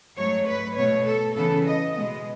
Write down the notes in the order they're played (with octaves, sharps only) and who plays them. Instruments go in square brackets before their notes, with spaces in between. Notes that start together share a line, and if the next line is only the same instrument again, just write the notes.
[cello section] G#2 F#3 A3 C#5
B4
B2 A3 C#5
A4
C#3 E3 B3 A4
D#5
B2 G#3 B3 D#5